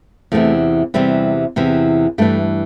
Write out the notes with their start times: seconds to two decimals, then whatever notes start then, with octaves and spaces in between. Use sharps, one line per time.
0.32 E2 C3 E3 A3
0.94 E2 C3 E3 G3
1.56 E2 C3 E3
2.18 G2 E3 A3